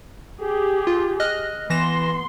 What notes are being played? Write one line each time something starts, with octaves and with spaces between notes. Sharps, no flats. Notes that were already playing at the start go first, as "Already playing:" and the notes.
G4 G#4
F4
D#5 F6 F#6
E3 B3 C6 A#6 E7